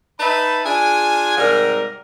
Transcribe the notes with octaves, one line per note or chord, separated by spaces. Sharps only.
D#4 B4 D#5 E5 A5 B5
D4 F4 G#4 G#5
G#2 C3 G3 A#4